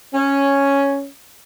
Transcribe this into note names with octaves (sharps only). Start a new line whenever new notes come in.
C#4